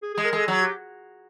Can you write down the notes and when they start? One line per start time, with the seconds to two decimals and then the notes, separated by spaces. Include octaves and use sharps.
0.03 G#4
0.14 G#3 G#4
0.25 A#4
0.33 G#3 A4
0.48 F#3 G#4
0.62 G4